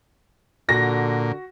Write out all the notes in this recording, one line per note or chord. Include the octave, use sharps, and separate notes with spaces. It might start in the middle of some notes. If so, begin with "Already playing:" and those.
A#2 D3 F#4 A#6